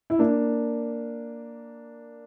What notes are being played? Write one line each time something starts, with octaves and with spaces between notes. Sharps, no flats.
E4
A#3 D4